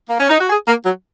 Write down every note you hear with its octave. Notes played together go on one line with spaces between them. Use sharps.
A#3
C#4
D#4
F#4
G#4
A#3
F#3